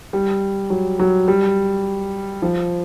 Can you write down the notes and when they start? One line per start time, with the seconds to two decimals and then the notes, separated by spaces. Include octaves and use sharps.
0.13 G3
0.70 F#3
0.99 F#3
1.28 G3
2.42 F3